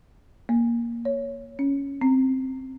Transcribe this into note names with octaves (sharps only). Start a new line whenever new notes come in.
A#3
C#5
C#4
C4